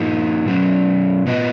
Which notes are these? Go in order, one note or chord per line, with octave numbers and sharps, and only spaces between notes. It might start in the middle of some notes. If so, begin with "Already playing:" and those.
Already playing: F3 A#3 D#4 F#4
B2 F#3 C#4
B3 F4 B4 D#5